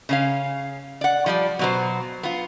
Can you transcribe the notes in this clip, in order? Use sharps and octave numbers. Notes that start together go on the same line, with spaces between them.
C#3 C#4 F5
D5 F#5
F3 G3 D5
B2 F#3 C5
B3 F4